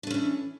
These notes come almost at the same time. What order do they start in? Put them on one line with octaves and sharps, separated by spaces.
D4 A3 C#4 E3